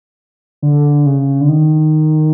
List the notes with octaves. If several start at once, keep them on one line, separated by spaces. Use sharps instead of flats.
D3
C#3
D3
D#3